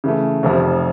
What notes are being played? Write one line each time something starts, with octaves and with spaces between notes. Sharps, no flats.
C#3 E3 A3
F1 F2 C3 F3